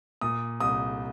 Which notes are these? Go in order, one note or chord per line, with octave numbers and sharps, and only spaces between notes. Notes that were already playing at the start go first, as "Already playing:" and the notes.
A#2 D#6
C2 D#6